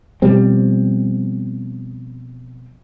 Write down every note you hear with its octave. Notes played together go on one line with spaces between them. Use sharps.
B2 F3 G3 C4